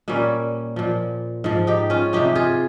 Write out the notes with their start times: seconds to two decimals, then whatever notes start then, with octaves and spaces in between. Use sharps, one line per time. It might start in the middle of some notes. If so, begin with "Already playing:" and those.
0.08 A#2 G3 A#3 C#4
0.76 A#2 F3
1.44 G#2 F3
1.67 D#4 G4
1.90 C#4 F4
2.13 C3 F3 D#4 G4
2.35 F4 G#4